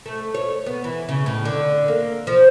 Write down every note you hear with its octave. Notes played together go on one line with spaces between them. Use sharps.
A3
C#5
B3
E3
C#3
A2
D3
A#3
F3